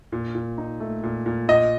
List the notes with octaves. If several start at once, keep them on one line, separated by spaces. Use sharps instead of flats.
A#2
A#2
D#4
A3
A#2
A#2
A#2 D#5